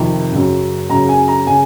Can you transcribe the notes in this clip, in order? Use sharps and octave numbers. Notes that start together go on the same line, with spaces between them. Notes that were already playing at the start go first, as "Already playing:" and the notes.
Already playing: F2 C3 D#3
F#2 C#3
F#2 C#3 A#5
G#5
A#5
C#3 G#5